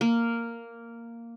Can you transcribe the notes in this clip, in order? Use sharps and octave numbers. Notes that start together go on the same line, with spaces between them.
A#3